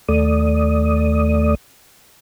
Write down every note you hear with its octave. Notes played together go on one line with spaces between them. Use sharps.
D#2 A3 D5 D#6